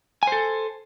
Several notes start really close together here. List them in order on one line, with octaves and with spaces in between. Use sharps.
G#5 C5 A4